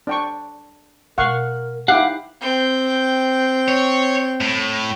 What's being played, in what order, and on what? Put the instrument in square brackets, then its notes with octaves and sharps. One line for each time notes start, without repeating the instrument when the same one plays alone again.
[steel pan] D4 G5 C#6
[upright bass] B2 G#3 [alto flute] A#4 [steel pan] F5 F#5 C#6
[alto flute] D#4 [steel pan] E4 G4 [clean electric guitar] F5 F#5
[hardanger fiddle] C4 G5
[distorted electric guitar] C#5
A2